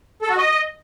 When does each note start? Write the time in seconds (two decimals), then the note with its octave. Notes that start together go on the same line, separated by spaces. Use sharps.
0.22 A4
0.30 F#4
0.37 D#5